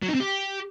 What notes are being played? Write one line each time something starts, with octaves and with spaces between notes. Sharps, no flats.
F#3
D#4
C4
G4